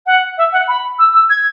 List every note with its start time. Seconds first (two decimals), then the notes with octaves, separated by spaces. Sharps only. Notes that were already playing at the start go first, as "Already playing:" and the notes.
0.06 F#5
0.37 E5
0.52 F#5
0.68 B5
0.99 E6
1.14 E6
1.29 G#6